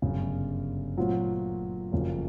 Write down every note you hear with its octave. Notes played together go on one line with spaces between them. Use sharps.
G1 F#2 C#3
A#2 F#3 A3 C4 F4
F#1 F2 C#3